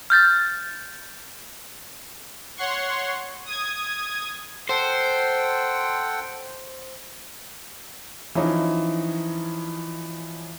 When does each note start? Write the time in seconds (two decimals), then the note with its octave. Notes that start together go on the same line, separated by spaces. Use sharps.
0.10 F6 G6 A6
2.57 C#5 F#5 C6 C#6
3.45 D#6 G#6
4.69 A4 C5 F#5 G5
8.35 E3 F3 C#4 D#4